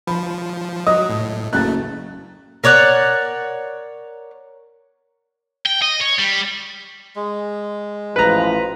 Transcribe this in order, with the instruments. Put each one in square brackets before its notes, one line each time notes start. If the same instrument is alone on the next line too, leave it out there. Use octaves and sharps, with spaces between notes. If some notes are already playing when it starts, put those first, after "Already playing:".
[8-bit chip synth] F3 [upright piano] B5
[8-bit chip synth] F#3 [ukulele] D#5 [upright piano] D#6
[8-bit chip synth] A2
[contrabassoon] F#1 [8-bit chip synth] A3 [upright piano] F#6 A6
[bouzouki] A#4 C#5 D5 F#5
[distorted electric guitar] G5
D#5
C#5
G3
[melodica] G#3
[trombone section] A1 F3 [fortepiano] B4 A#5